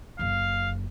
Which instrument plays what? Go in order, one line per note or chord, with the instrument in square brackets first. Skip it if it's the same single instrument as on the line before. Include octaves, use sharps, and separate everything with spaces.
[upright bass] F#1 F#2 [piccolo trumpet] F5